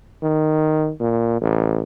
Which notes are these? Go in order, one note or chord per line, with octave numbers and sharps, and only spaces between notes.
D#3
A#2
A1